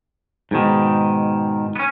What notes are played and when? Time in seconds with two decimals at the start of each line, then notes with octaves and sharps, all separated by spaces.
0.51 G#2 B2 D#3
1.76 B3 C#4